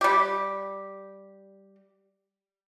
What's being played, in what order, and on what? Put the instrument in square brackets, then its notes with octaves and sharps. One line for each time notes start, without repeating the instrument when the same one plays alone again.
[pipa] G3 G4